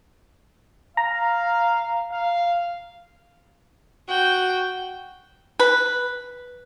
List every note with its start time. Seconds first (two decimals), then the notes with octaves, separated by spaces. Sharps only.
0.97 F5 A#5
2.12 F5
4.09 F#4 G5
5.60 B4